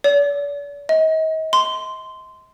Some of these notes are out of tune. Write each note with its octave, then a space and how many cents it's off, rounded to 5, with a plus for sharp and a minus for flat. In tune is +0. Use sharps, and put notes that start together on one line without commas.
D5 -45
D#5 +35
C6 -15